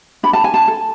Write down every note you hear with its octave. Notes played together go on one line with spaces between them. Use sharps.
D4 B5
A5
G#5
A5
A4